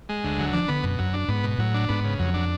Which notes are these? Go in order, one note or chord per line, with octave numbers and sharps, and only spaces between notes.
G#3
D2
D3 F#3
F3 D4
D3 B3
F#2 B2
F#2 F#3
D4
G#2 B3
B2
A2 F#3
D4
G#2 B3
C#3
F2 F#3
D4